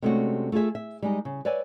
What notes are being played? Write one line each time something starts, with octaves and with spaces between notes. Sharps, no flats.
C3 G#3 A3 C#4 D4 F#4
A3 F4 F#4 G#4 E5
E5
G3 G#3 D#4
C#3
B4 C#5 D5 E5 G#5